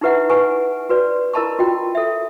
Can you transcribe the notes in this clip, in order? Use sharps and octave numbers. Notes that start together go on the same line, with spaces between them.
D#4 E4 G4 B4 E5 F#5
G4 B4 G#5 C#6
F#4 B4 D5
E4 A#4 D#5 A5 B5 C#6
F4 F#4 D#5 G5
A4 E5